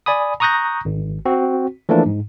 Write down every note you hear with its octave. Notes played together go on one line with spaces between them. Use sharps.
D5 G#5 B5 D#6
A#5 C#6 D#6 F#6 G6 A#6
G#1
C4 F#4
E3 F3 A3 A#3 D4
G#2